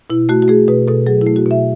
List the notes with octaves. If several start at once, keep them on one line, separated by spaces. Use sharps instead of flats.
B2 E4
A3 F#4
F#4
A3 G#4
B2 B4
B2 A4
F#3 G#4
E4
A3
F#4
B2
E5